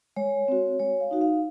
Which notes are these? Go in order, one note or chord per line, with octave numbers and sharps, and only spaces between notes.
G#3 C#5
C4 F#4
G#3 C#5
F5
D#4 F#4
F5